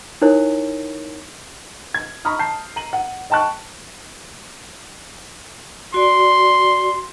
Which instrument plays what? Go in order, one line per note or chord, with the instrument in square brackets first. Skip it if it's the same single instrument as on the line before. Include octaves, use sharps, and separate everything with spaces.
[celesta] D#4 E4 A#4 C#5
[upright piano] G#6
A#5 B5 C#6 D#6 F6
A5 G6 C7
A#5 D#7 F#7
F#5
D#5 G5 A5 C#6 F#6
[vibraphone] F#4 D5 [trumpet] C6